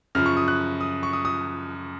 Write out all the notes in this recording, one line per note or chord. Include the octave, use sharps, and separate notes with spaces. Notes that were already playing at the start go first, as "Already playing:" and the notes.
F#2 C#3 F3 F6
C#6
D#6
F#6
D#6
C#6
D#6
D#6